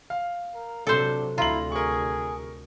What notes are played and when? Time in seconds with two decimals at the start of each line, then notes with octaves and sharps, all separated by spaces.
0.10 F5
0.55 A#4
0.87 C3 F#3 D4 A4 C5
1.38 D2 C3 E4 F4 A#5 F#7
1.72 G#4 A#4 C#6